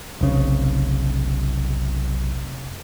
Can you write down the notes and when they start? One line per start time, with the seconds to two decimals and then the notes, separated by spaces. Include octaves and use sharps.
0.21 F1 B1 C#3